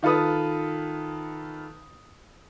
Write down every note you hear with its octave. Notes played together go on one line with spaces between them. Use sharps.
D#3 F4 A4 B4 D#6